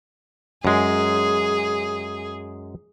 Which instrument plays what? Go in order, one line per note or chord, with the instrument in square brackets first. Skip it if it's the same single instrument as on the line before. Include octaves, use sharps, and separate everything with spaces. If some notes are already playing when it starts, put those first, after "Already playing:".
[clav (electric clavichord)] F#2 G#3 [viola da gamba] G#4